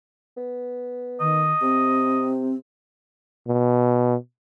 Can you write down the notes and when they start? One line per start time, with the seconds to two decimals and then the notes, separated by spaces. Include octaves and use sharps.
0.37 B3
1.21 D#3 D#5
1.62 C3 C4
3.48 B2